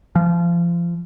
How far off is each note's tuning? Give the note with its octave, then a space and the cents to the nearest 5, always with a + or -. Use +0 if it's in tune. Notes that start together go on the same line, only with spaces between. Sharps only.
F3 -30